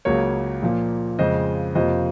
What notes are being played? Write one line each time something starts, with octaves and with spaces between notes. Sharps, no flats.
C#2 C#3 F#3 A#3 A#4 C#5
A#2 F3 A#3
F2 C#3 G#3 C5 D#5
F2 C3 F3 A#3 C5 D#5